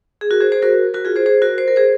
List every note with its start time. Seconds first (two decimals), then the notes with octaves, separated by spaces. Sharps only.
0.21 G#4
0.31 F#4 A#4
0.41 G#4 C5
0.52 G#4 C5
0.62 F#4 A#4
0.94 F#4 A#4
1.05 F4 G#4
1.16 G#4 C5
1.26 G#4 C5
1.42 F#4 A#4
1.58 C5
1.68 A#4
1.76 G#4 C5